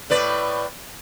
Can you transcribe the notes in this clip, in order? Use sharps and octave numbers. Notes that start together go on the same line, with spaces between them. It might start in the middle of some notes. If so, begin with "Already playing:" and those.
A2 B4 D5